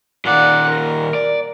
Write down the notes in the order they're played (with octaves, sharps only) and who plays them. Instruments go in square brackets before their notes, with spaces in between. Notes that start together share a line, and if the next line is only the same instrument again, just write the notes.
[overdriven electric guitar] A#2 D#3 [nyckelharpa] D5 F#5
[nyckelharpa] A#4
[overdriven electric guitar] D5